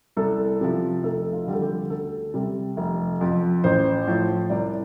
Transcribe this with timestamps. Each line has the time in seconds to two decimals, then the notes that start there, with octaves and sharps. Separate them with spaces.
0.17 C2 A4
0.61 C3 F3
1.03 F1 A4
1.33 F4
1.47 F2 D3 G3
1.53 A4
1.62 G4
1.90 D2 A4
2.34 C3 G3
2.77 F1
3.21 F2 F3
3.64 A1 C5
4.07 A2 F3
4.50 C2 D5